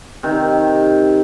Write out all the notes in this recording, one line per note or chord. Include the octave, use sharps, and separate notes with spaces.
C3 D#3